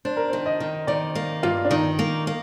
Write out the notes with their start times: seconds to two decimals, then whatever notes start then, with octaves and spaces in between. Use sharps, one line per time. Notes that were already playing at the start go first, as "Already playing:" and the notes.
0.05 D4 C5
0.17 A#4
0.30 D#3 C5
0.46 D#5
0.60 D#3
0.87 D#3 D5
1.15 A#3
1.43 G2 F4
1.65 D4
1.71 D#3 D#4
1.99 A#3
2.27 A#3